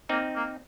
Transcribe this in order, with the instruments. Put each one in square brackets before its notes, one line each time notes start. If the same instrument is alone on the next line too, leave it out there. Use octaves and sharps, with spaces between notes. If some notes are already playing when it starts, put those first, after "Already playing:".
[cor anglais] A#3 [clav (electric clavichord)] C4 D#4
[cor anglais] A#3